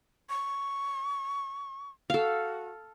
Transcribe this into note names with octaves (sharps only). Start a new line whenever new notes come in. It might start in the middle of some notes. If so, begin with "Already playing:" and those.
C#6
F#4 A4 F5